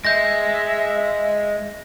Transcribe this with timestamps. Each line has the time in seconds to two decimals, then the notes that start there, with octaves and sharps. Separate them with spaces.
0.05 G#3 E5 G6 A#6